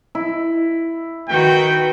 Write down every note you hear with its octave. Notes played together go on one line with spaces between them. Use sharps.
E4
D#3 F#4 B4 G5